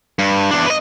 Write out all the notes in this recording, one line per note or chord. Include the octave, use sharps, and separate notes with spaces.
G2
E2 D4
B4 D#5